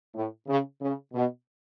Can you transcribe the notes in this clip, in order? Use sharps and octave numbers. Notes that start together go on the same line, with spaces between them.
A2
C#3
C#3
B2